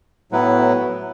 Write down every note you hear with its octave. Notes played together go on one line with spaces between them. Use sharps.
A2 F#3 B3 E4 B4